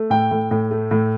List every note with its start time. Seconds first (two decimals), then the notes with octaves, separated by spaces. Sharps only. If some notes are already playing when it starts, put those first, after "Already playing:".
Already playing: A3
0.10 A2 G5
0.31 A2
0.51 A2
0.71 A3
0.91 A2